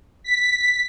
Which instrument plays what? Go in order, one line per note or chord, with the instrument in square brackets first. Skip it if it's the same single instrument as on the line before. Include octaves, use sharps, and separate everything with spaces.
[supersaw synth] B6